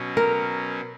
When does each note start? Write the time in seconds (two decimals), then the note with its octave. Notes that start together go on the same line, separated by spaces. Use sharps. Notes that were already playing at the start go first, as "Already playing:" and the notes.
Already playing: B2 F#3 C#4
0.17 A#4